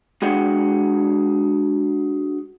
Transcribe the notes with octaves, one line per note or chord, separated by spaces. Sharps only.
G#3 D4 F#4 G#4 F#5 G5